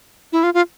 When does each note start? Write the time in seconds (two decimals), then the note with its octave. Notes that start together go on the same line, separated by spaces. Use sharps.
0.32 E4
0.43 F4
0.54 F4